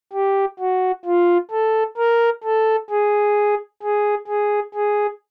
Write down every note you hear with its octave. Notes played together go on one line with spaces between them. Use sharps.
G4
F#4
F4
A4
A#4
A4
G#4
G#4
G#4
G#4